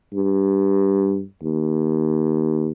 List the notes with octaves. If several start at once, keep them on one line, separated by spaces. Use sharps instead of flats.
G2
D#2